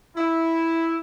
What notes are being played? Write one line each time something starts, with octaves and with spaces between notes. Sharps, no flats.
E4